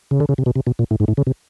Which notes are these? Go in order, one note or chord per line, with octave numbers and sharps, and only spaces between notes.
C#3
D3
C#3
C3
B2
C3
B2
A#2
A2
G#2
A2
C#3
C3